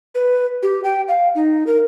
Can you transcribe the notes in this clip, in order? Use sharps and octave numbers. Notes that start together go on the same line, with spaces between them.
B4
G4
G5
F5
D#4
A#4